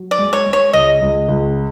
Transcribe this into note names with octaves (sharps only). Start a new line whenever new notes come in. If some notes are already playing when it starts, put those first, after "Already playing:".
Already playing: F#3
D5
G#3
C#5
G#3
C#5
C#2 D#5
C#2
C#2